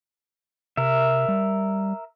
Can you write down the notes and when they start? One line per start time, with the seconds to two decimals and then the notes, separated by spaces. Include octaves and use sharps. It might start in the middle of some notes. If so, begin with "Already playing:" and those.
0.77 C3 A#4 E5
1.29 G3